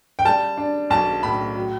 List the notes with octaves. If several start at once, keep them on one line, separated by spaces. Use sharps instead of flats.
G5
G3 A5
D4
B1 A5
A2 B5
F#3